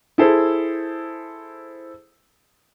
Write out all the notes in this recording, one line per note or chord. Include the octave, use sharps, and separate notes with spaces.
E4 G#4 A4 C5